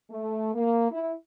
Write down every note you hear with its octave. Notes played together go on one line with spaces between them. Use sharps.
A3
A#3
E4